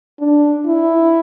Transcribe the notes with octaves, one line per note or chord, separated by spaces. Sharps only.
D4
E4